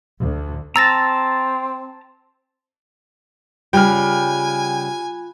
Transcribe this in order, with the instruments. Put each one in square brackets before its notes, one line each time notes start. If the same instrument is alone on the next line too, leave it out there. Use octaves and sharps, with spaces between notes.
[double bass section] D2
[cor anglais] C4 [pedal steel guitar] A5 A#5 [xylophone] E6 A6 A#6
[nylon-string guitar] C#3 G3 [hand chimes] F4 B5 F#6 [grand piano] G5 F6 [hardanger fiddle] G#5